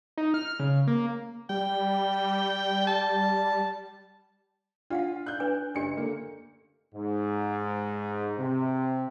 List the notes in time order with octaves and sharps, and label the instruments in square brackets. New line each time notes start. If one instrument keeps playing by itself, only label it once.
[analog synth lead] D#4
F6
C#3
A#3
[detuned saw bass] G3 [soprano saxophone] G5
[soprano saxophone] A5
[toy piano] D4 F5 F#5 [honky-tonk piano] F4
[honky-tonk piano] F#6 G6
[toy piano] D4 B4 G#5
[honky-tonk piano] F#1 C#7 [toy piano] D4 G4
[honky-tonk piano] D3 A#3
[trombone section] G#2
C3